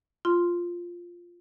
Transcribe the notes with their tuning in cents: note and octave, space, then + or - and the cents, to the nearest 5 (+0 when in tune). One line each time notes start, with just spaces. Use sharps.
F4 +0 C6 +0